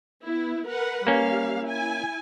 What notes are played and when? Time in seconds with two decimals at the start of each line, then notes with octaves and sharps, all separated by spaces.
0.24 B3 E4
0.67 A#4 B4 F#5
1.07 G3 A#3 C#4 F5
1.64 E4 G#5